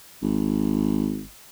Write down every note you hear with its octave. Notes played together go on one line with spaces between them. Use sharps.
G#1